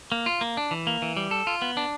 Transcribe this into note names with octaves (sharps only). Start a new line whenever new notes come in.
A#3
F4
A#3
D4
E3
A#3
E3
G3
A4
F4
B3
D4